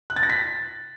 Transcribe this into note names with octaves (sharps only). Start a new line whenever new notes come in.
F#6
A6
A#6
B6